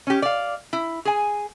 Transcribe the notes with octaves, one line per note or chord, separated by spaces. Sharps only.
C#4 G4
D5 F5
E4
G#4 G#5